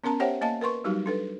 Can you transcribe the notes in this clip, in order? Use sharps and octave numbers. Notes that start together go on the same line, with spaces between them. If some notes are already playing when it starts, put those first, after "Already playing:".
B3 C#4 A#4 A5 A#5
G4 C5 C#5 E5 F#5 G5
A#3 D#5 F5 A5
A#4 B4 C6 C#6
F#3 G3 D#4 F#4 G4
D4 A4 B4